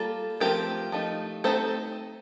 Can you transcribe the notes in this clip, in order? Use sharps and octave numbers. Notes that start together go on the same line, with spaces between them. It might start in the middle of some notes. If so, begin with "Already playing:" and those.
Already playing: G3 A#3 F4 A4
F3 A3 C4 F4 G4 A#4
F3 A3 D#4
A3 C4 D#4 A4 C5